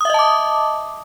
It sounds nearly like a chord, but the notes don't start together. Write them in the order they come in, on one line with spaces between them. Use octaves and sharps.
D#6 E5 D#5 A5 D6